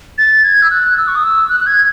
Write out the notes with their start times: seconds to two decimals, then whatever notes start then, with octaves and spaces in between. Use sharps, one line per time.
0.18 A6
0.44 G#6
0.62 E6
0.71 F#6
0.97 E6
1.08 C#6
1.15 D#6
1.24 E6
1.49 F#6
1.60 F#6
1.66 G#6